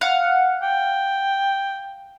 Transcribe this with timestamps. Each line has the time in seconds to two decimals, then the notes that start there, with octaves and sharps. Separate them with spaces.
0.01 F5 F#5
0.63 G5